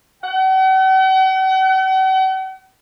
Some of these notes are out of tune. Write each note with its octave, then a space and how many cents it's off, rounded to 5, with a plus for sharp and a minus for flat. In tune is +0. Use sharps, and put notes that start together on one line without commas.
F#5 +45